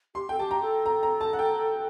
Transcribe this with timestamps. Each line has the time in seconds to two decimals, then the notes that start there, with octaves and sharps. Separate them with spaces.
0.15 G4 C6
0.29 A4 G5
0.39 G4 A5
0.51 A#5
0.62 A4
0.86 A#5
1.03 A#5
1.21 A5
1.33 F#5
1.39 G5